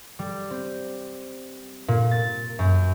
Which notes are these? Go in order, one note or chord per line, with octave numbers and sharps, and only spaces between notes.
G3
C4
A#2
A6
F#2